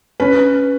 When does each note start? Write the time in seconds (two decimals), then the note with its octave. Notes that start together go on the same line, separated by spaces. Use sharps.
0.20 C#4 B4